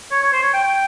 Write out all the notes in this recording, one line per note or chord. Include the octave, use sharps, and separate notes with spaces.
C#5
C#5
C5
C#5
G5
G5